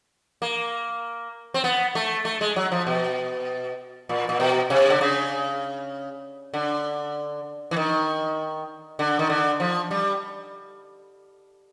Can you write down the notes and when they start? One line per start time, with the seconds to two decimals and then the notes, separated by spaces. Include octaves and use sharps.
0.42 A#3
1.54 C4
1.64 B3
1.95 A3
2.25 A3
2.41 G#3
2.56 F#3
2.72 F3
2.87 B2
4.09 A#2
4.29 A#2
4.40 B2
4.70 C3
4.90 D3
5.01 C#3
6.53 D3
7.71 E3
7.76 D#3
8.99 D3
9.19 D#3
9.30 D3
9.60 F3
9.91 G3